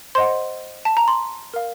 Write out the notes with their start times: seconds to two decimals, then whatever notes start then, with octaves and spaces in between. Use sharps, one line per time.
0.15 C5 D#5 F#5 C6
0.85 A5
0.97 A#5
1.08 C6
1.54 A#4 F5